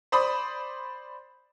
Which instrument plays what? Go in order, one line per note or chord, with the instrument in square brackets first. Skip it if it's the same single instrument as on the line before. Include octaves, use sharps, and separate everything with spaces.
[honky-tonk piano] C5 D5 B5 D#6